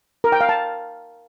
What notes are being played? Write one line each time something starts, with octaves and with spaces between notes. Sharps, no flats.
A#4
G5
F5
A5